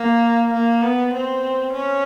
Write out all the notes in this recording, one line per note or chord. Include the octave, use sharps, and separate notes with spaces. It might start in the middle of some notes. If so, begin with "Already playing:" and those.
Already playing: A#3
A#3
B3
C4
C#4